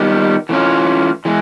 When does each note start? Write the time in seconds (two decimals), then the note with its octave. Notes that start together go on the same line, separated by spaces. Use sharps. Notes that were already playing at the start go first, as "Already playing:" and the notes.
Already playing: D#3 G3 B3
0.49 E3 A3 C#4 F4
1.25 E3 G#3